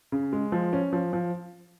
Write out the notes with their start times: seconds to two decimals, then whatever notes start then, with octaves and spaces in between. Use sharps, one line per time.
0.12 C#3
0.33 G#3
0.52 F3
0.73 C#4
0.93 F3
1.13 F3